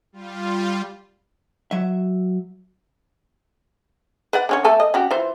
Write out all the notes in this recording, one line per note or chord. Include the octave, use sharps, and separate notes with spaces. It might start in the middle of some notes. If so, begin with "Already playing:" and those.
G3 F4
F#3 E5
B4 D5 F#5
D3 C#4 C#5
A3 A4 G#5
D#5
C#4 F#4 G4
E3 F4 C5